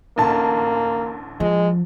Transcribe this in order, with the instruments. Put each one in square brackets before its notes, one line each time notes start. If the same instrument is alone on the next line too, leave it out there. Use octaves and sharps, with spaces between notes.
[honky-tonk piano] A1 D2 A5 [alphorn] A#3
[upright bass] F3 [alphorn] G#3